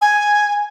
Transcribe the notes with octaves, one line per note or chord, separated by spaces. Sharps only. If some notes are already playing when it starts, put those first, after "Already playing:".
G#5